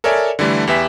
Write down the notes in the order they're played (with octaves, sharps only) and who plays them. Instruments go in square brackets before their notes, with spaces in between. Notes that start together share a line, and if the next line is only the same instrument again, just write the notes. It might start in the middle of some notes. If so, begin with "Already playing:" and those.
[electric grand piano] A4 A#4 C#5 D5 E5 G#5
D3 E3 G3 A3
E2 G4 B4 E5 G#5 B6